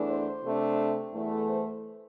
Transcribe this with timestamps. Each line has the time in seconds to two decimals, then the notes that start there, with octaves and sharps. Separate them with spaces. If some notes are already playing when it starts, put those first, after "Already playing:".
Already playing: E2 E3 A3 D4
0.08 C5
0.44 C3 A3 D4
1.13 E2 E3 A3
1.48 C5